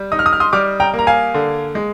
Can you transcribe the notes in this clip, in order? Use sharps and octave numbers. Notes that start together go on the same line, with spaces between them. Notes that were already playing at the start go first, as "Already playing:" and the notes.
Already playing: G3
D#4 D#6
F6
D#6
F6
C6 D#6
G3 D6 F6
G5 A#5
A#3
A#5
F5 G#5
D3
G#3